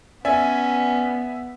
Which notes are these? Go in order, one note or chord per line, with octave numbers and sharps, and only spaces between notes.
B3 C#4 D5 E5 G#5